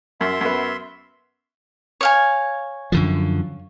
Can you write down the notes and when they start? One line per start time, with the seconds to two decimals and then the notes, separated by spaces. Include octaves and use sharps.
0.21 F#2 E5 C6
0.41 F#2 B3
2.01 C#5 F5 G#5
2.92 F#2 D3 F3